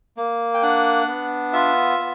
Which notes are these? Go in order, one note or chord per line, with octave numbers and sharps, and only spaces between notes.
A#3
G5
D4 F#5
B3
F4 E5
B3